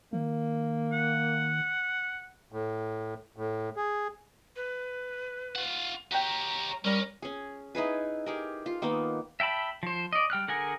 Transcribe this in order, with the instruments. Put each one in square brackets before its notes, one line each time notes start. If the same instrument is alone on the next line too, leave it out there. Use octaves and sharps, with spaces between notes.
[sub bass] D#3 [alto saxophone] A#3
[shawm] F#5
[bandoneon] A2
A2
G#4
[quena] B4
[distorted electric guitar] F4 F#5
[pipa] F#4 G5 [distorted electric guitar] G4 C#5 [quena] A#5
[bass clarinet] G3 [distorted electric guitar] C#4 [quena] A#4
[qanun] C#4 G#4
D#4 E4 G#4 B4
G4 G#4 A#4
F4
D#3 A#3 B3 D#4
[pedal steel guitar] E5 G5 A5 B5
F3 C5
D5 D#5
G3 G5 F6 F#6
D3 G#4 A#4 F#5 G#5